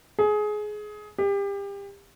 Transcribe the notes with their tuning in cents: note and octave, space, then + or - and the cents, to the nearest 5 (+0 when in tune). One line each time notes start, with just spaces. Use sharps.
G#4 +20
G4 +30